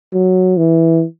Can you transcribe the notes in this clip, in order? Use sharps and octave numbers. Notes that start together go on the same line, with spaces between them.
F#3
E3